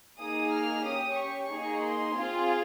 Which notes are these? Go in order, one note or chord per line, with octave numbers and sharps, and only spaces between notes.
A#3 D#4 G#4 D#6
F6
C#4 G4 D#6
C#6
A#3 D#4 G#4
C6
C4 F4 G#4